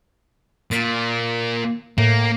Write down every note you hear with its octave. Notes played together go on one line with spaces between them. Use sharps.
A#2 A6 B6
A2 A#3